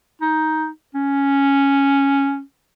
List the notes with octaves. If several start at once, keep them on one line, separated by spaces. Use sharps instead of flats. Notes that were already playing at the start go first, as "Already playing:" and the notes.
D#4
C#4